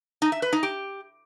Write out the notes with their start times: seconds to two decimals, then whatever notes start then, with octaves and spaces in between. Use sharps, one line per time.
0.22 D#4
0.32 E5
0.42 B4
0.53 D#4
0.63 G4